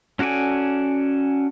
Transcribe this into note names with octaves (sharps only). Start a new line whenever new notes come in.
C#4 F#4 A4 D5 G#5